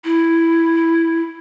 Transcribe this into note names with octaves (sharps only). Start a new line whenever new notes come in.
E4